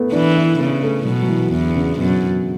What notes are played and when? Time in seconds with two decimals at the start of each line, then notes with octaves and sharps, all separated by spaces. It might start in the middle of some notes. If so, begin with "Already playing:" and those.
Already playing: A3 B3
0.12 E3 D4
0.36 E4
0.59 C#3 B3
0.83 A3
1.05 B2 F#3
1.22 F#3
1.29 E3
1.52 E2 D3
1.75 C#3
1.99 F#2 B2